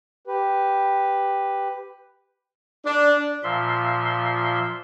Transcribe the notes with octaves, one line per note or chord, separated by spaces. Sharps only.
G4 B4
D4
A#2 F3 E5 C6